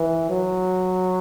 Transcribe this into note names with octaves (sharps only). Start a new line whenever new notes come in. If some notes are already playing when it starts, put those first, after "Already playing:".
Already playing: E3
F#3